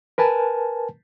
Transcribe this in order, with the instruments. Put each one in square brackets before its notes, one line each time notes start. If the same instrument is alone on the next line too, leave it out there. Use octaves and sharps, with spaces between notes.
[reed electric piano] A#4 B4 G#5 A5